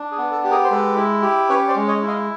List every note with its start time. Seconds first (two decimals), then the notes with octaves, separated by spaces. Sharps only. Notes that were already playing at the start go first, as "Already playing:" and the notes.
Already playing: D4
0.11 G#4
0.18 B3
0.31 A4
0.44 G4
0.51 G#4 A#4
0.64 C5
0.71 G#3 A4 B4
0.96 E4
1.22 G4
1.49 C#4 B4 C#5
1.68 C5 D5
1.75 G#3
1.88 C#5 D#5
2.02 E4
2.08 D#5 F5